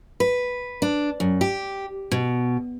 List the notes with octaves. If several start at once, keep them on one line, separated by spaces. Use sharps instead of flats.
B4
D4
F#2
G4
B2